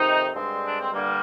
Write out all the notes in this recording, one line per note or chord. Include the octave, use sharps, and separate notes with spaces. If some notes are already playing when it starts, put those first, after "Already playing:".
Already playing: F2 C3 D#3 C4 D#4
G2 D3 G#3 C4
D4
C4
G2 D3 G3 A#3